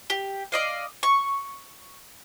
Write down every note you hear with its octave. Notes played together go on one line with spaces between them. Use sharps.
G4
D5 D#5 F5
C#6